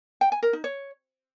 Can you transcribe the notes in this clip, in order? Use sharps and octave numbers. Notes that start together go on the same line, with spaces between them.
G5
G#5
A#4
D#4
C#5